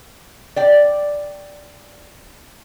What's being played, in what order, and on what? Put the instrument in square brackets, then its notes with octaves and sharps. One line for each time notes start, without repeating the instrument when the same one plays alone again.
[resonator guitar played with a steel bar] D5 G5